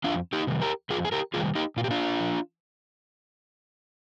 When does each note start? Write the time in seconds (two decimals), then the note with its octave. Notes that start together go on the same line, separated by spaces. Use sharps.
0.04 F2 D4 F4
0.33 D#4 G4
0.47 C3 D#3 G3
0.62 G4 A#4
0.90 F2 F4 G#4
1.05 G#4
1.12 G4 A#4
1.34 C3 D#3 G3 F4 G#4
1.55 D#4 G4
1.77 A#2 F4
1.84 G4
1.91 D4 F4
2.20 F3